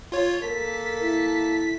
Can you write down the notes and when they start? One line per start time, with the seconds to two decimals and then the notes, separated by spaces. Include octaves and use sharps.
0.12 F4 C#5
0.42 A#3 A4 A#4 A5 B6
1.01 E4